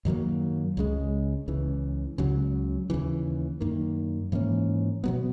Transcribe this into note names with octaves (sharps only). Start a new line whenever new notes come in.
F#2 D#3 F#3 A#3
C#2 C#3 G#3
C#2 C#3 E3
C#2 C#3 F#3
D#2 C#3 E3
F#2 D#3 A#3
G#2 E3 A#3 C#4
B2 F#3 B3